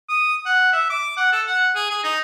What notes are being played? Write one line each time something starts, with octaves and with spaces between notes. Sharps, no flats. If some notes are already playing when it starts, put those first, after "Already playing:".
D#6
F#5
E5
D6
F#5
A4
F#5
G#4
G#4
D#4